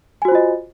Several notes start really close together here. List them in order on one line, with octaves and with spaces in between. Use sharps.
G#5 F#4 C5 F4 D#5